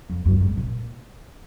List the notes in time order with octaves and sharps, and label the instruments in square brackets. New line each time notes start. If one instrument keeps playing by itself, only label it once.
[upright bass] F2
F#2
G#2
A#2